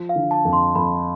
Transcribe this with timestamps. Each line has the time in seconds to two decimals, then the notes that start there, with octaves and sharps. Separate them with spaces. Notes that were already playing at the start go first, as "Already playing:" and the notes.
Already playing: F3
0.09 F5
0.16 D3
0.31 A5
0.45 F2
0.53 C6
0.75 F2 B5